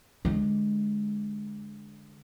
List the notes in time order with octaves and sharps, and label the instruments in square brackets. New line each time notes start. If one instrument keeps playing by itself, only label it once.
[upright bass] D3 G#3